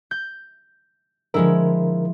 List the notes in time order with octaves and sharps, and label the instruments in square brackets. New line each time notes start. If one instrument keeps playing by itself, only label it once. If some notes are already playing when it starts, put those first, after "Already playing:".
[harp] G6
[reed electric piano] D3 A#4 [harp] F3 G#3 E4